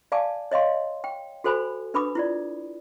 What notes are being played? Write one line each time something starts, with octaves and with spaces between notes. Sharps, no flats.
D5 F5 G#5 A5 D6
C#5 D#5 F5 C6
G5
F#4 A4 C5 G#5 B5
D4 B4 B5 D6 D#6
E4 F4 D5